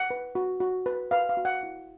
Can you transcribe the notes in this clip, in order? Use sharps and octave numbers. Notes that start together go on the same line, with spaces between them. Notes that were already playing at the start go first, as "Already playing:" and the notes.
Already playing: F#5
B4
F#4
F#4
B4
B4 F5
F5
F#4
F#5
E4